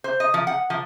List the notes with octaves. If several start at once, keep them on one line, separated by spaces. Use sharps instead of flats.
C5
D#5
F3
F#5
F3